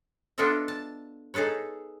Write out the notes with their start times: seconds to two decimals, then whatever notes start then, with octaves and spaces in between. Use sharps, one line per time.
0.38 B3 D4 F4 A4 D#5 E5
0.68 A5
1.34 D#4 G#4 A4 B4 C#5